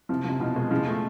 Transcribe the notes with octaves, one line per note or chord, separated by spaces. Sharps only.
C3 F3
C3 F3
B2 F3
G#3
C#3 F3
A3